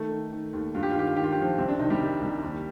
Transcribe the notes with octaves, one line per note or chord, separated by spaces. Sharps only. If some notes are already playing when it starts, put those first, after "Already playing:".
Already playing: D#3 A3 A4
D#3
D#3
D#2
G2 F4
G4
F4
D#3 G4
F4
D#3 G4
F4
G4
D#3 F3 F4
C2 C4
D4
C3 D#3 D#4
G3 G4
C2
C2
D#2